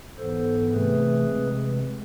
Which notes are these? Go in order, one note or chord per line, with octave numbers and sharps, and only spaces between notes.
G#2 E3 B3 A4 C5
C3 E3 A3 C4 G#4 B4
C3 G#3 C4